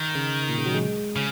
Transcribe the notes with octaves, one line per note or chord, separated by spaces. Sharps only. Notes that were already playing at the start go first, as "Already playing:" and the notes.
Already playing: D#3
C#3
A#2
C#3
F#3
G#3
C#3